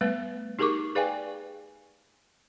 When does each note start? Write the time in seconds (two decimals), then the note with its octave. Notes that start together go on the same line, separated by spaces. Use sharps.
0.01 G3 A3 B3 B4
0.59 D#4 G4 G#4 A#4 C#6 D6
0.95 G#4 B4 D5 F5 G5 G#5